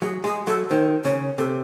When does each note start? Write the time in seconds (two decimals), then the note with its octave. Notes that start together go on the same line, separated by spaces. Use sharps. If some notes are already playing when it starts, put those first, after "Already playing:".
0.02 F#3 G#4
0.24 G#3 G#4
0.47 F#3 A4
0.70 D#3 C5
1.04 C#3 C#5
1.38 C3 A4